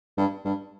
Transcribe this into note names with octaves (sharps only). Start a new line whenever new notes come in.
G2
G2